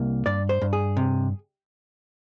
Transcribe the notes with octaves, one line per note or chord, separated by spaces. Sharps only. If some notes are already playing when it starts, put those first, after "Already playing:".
Already playing: C2 A#3
G2 D5
C5
G2
G#4
C3